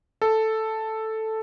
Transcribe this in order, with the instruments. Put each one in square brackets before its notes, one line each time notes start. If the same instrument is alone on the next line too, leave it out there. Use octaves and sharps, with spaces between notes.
[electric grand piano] A4